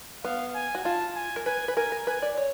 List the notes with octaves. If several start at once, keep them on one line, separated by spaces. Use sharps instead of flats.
B3 F5
G#5
F#4
F4 A5
G#5
A#4
B4 G#5
B4
A#4 G#5
A#4
B4 G#5
D5
C#5